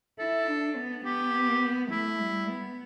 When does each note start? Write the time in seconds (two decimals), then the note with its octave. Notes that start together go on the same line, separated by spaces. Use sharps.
0.19 E4 A4
0.47 D4
0.76 B3
1.05 B3 G4
1.90 A3 E4
2.20 G3
2.49 B3